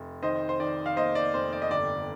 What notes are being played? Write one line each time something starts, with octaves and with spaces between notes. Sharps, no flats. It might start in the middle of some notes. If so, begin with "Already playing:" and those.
Already playing: F1
D#3 C5 D#5
C5
D#3 D5
F5
A#3 C5 D#5
D5
F1 C5
D5
D#5
G1 D5